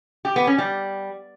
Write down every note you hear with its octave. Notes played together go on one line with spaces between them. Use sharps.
G4
B3
C#4
G3